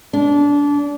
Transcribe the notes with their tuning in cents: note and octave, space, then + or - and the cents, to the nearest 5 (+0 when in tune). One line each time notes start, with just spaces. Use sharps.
D4 -25